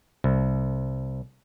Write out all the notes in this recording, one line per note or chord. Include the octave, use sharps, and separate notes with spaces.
C2